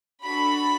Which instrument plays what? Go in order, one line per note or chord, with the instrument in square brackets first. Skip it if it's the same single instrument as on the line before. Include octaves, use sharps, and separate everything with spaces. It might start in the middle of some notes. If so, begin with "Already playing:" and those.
[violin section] D4 F#4 A4 B5